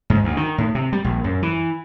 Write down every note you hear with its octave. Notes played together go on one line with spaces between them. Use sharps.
G#2
D2
D#3
A2
C3
G3
A#1
F#2
E3